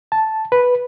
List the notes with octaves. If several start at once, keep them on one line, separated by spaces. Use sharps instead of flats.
A5
B4